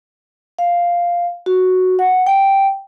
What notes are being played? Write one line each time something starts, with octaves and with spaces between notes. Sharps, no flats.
F5
F#4
F#5
G5